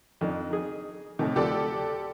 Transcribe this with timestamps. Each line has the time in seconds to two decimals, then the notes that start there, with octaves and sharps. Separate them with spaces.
0.21 F2 D#3 D4
0.51 D#4 G#4
1.19 A2 C3 D#3
1.36 D2 F3 G4 A4 D5